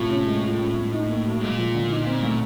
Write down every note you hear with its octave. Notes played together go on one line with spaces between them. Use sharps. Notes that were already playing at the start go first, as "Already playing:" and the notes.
Already playing: A2 C3 F4
C#4
G#3
F4
C#4
A3
D#4
A#3
F#3
A#2 G#3
F3
D3
D#4
C4
A3